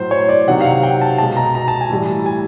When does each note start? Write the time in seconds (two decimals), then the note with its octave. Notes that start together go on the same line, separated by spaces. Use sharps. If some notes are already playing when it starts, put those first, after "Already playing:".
Already playing: A2 F#3 C5
0.11 C#5
0.29 D5
0.48 C3 D#3 F#3 F#5
0.61 F5
0.65 F#5
0.83 G5
1.01 A5
1.18 B2 G#3 A5
1.37 A#5
1.55 A#5
1.68 A5
1.81 G#5
1.90 A2 E3 G3 A5
2.26 G#5